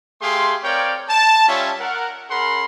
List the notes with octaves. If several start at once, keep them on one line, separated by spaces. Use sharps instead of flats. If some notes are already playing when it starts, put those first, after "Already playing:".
A3 G4 G#4 F5 C6
C4 A#4 C#5 D5 F5 G5
A5
G3 C#4 F4 C#5 E5
A#4 F#5
C#4 G#4 A#4 F#5 B5 C6